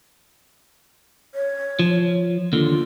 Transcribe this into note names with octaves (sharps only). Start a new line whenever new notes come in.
C#5
F3
D#2 D3 F4